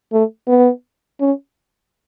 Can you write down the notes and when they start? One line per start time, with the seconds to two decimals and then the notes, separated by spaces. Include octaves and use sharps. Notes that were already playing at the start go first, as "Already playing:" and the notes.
0.12 A3
0.48 B3
1.21 C#4